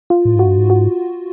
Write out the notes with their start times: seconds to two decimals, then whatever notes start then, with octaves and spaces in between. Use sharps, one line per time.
0.10 F4
0.25 A2
0.35 G#2 F#4
0.46 G2
0.58 G#2
0.70 F#4